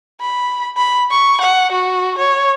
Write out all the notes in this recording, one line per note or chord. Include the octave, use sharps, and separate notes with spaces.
B5
B5
C#6
F#5
F#4
C#5